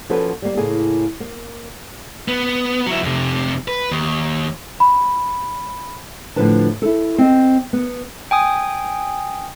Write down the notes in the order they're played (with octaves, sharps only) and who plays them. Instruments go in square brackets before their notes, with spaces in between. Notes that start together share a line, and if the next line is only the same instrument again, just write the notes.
[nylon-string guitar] F3 A#3 C#4 F#4 A4 B4
G3 A#3
A2 C#3 A#3 G#4
A#3
[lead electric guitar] B3
F#3 E4
F2 C3
B4
D#2
[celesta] B5
[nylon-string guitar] A2 D3 F3 F4 B4 A5
E4 A4
C4 C5 D#5
B3
[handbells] G5 G#5 D#6